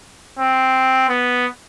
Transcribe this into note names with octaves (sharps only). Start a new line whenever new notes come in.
C4
B3